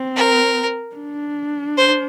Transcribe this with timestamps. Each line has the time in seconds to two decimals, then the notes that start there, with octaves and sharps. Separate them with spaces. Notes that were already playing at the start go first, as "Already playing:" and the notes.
Already playing: C4
0.16 A#4
0.96 D4
1.77 C5